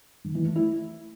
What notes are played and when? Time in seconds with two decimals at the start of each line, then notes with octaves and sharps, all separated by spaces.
0.24 D#3
0.35 E3
0.45 A3
0.56 E4